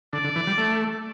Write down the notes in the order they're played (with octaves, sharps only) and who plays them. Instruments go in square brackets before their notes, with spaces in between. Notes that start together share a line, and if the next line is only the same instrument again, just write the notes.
[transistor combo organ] D3 [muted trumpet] D5
[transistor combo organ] D3
E3
G3
A3